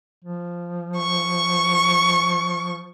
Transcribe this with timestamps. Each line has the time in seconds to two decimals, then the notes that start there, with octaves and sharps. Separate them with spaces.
0.24 F3
0.97 C#6